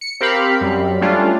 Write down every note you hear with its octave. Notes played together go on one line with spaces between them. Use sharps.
C#7
C4 G4 A#4 F5 B5
F#2 G3
G3 A3 C#4 D4 F4